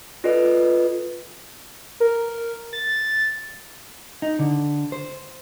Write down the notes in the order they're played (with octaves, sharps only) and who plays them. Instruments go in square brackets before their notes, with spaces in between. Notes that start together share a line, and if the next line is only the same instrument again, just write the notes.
[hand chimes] F4 A4 B4 D5 D#5
[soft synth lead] A#4
A6
[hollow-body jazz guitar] D#4
D3
C5